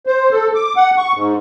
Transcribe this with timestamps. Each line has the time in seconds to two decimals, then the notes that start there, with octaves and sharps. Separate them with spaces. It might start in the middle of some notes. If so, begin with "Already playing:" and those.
0.07 C5
0.32 A4
0.55 D6
0.76 F#5
0.98 C#6
1.15 G#2